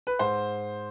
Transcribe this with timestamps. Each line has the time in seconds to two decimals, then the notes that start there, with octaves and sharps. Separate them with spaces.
0.07 B4
0.19 G#2 C5